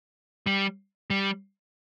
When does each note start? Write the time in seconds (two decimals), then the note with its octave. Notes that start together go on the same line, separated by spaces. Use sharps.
0.46 G3
1.10 G3